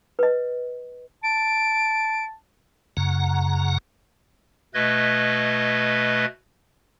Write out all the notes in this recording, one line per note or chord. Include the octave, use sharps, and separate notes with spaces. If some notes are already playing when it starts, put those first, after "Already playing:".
B4 D#5
A5 D7
F#2 C#3 F#5 A#5
B2 A3 B4 D#5 G#6